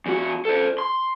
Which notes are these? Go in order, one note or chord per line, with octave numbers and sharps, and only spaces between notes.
E2 F#4
A4 C5
C6